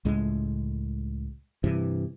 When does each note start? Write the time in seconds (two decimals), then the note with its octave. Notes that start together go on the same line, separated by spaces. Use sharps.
0.05 C#2 A2 G#3
1.64 G2 C3 E3